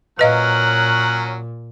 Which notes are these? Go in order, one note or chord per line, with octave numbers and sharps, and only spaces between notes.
A#2 F#3 C#4 A#4 B4 D#5 F5 F#6